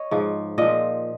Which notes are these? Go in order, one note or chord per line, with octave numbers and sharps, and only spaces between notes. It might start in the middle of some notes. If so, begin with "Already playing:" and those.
Already playing: C#5 D#5
G#2 F3
A#2 F3 D#5